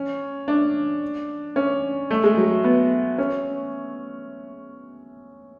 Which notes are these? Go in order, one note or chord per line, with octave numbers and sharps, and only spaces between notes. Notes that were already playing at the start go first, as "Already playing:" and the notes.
Already playing: C#4
D4
C#4
A3
G#3
F#3
B3
C#4